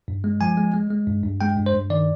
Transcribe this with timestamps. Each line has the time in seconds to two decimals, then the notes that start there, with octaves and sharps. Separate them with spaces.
0.08 G2
0.24 G#3
0.41 F3 G#5
0.57 G#3
0.74 G#3
0.90 G#3
1.07 G2
1.24 G2
1.41 G#3 G5
1.57 G2
1.66 C5
1.75 G2
1.90 D#3 D5